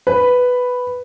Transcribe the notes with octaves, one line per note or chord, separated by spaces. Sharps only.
B4